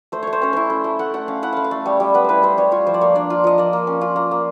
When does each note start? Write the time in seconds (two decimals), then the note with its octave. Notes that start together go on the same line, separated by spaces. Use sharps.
0.12 A3 C5
0.23 A3 C#5
0.33 C5
0.42 C#4 C#5
0.53 E4 C5
0.70 A3
0.84 A3
0.99 A3 F#5
1.14 A3 F#5
1.28 C#4 F5
1.43 E4 F#5
1.53 A3 F5
1.64 F5
1.71 A3
1.86 G3 C#5
2.00 G3
2.14 B3 B4
2.24 E4 B4 C5
2.43 G3 C5
2.58 G3 C#5
2.72 F4 C#5
2.87 F3 C5
2.94 D5
3.01 A#3 C#5
3.15 D4 D5
3.30 F4
3.44 F3 D#5
3.58 A#3 D5
3.73 A#3
3.87 C#4
4.01 F4
4.16 A#3
4.31 A#3